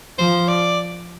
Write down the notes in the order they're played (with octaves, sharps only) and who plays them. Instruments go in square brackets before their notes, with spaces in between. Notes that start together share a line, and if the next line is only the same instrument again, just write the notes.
[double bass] F3 [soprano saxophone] C5
[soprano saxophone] D5